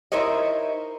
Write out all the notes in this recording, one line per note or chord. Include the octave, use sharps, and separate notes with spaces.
D#4 E4 A#4 C5 C#5 D#5